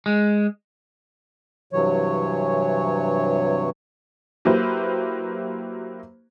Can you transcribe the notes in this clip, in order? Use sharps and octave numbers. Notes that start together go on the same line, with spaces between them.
G#3
G2 C3 E3 F#3 C#5
F#3 A#3 E4 G4 B4 C5